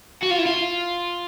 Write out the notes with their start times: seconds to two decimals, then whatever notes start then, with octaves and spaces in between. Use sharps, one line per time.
0.23 F#4
0.31 F4
0.39 E4
0.46 F4